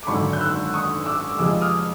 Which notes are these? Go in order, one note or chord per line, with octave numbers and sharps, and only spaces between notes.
D6
G#1 F#2 D3 B5 C#6
G6
E6 F#6
C#6 D#6
D6 E6
F2 C3 F3 G#3 D6 E6
D#6 F6